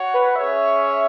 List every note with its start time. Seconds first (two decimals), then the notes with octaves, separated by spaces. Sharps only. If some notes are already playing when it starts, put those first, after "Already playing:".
Already playing: F#4 C#5 F#5
0.14 B4
0.36 C#4 G#4 C#5 E5